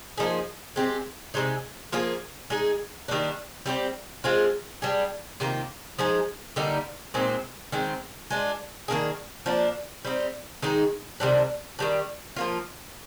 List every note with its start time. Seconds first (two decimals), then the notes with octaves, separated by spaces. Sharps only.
0.18 F3 A#3 D#4 G#4
0.76 G#3 C4 G4
1.34 C3 F3 G#3 D#4
1.92 F3 A#3 F4 G#4
2.50 G#3 D#4 G#4
3.08 D#3 G3 A#3 D4
3.66 G3 C4 D#4 G4
4.24 G#3 C4 F4 G#4
4.82 G3 D4 G#4
5.40 C3 D#3 A#3 F4
5.99 F3 G#3 D#4 G#4
6.56 D3 G3 A#3 D#4
7.14 A#2 G#3 C4 D#4
7.72 D#3 G#3 C4
8.30 G#3 D4 F4
8.88 D#3 A#3 D4 G#4
9.46 F3 A#3 D4
10.05 G3 C4 D#4
10.62 D#3 G#3 D#4 G#4
11.20 C3 D#3 G3 D4
11.79 D#3 G3 D4
12.36 F3 A#3 F4